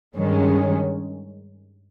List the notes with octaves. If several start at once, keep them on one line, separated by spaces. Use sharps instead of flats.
G2 D#3 G#3 C#4